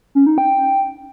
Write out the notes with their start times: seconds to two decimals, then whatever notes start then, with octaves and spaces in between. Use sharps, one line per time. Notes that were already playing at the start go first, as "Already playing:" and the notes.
0.15 C#4
0.26 D#4
0.38 G5